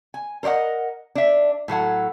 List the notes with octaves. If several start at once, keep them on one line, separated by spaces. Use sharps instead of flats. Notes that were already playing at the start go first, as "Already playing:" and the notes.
G#5
A#4 C5 D5 D#5 F#5
D4 E5
A2 F#3 A4 F#5